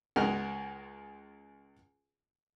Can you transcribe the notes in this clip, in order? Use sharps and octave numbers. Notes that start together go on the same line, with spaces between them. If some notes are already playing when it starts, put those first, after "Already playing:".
C#2 G#3 F#4 A#4 F6